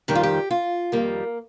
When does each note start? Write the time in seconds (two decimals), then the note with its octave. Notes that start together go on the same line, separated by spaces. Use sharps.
0.08 F2 D#3 G3 G4
0.15 F4
0.23 G4
0.51 F4
0.92 F2 D#3 G3 A#3